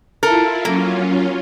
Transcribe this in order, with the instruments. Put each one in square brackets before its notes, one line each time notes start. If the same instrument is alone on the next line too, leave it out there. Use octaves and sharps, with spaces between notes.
[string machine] E4 F4 [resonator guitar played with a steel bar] A4 A#4
[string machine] F#3 C#4 F4 [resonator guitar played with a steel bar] A#3